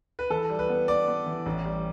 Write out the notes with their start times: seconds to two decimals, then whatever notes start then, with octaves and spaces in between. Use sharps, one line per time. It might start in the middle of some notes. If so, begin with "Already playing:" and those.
0.19 B4
0.30 E3 A4
0.50 G3
0.59 B4
0.69 B3
0.88 B3 D5
1.08 B3
1.26 E3
1.46 A1
1.65 G3